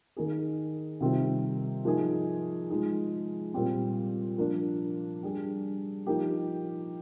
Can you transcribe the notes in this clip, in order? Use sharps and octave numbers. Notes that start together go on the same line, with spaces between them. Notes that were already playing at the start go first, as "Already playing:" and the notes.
D#3 A#3 D#4 G#4
C3 D#3 G3 C4 F4
F3 A#3 D#4 G#4
F3 G#3 D#4 G#4
A#2 G3 C4
F3 A#3 D4
G3 D4 G#4
F3 A#3 D#4 G4